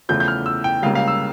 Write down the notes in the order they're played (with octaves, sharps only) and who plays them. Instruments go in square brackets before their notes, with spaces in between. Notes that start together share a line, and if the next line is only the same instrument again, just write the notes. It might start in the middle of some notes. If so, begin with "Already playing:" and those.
[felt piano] E2 C#3 F3 A3 E4 [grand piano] G6
[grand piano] G6
F6
E6
G5
[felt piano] C#2 C#3 G3 A#3 [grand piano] F5
[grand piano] F5
E6